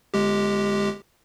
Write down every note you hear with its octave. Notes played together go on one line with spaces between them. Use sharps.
G1 G#3 G4